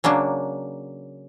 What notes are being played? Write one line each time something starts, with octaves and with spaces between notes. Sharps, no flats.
C#3 F#3 A#3 D4